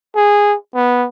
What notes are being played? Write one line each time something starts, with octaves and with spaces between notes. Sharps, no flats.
G#4
B3